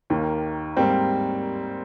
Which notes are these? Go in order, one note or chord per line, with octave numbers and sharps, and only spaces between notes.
D#2 D#3 A#3
G#2 G3 A#3 C4